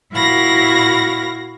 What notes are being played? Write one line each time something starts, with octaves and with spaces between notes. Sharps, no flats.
A#2 E4 F#4 F5 B5 A#6